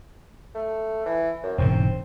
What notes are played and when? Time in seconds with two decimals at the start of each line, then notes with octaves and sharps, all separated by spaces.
0.55 A3
1.06 E3
1.43 F#2
1.58 E1 G#2 C#3 C4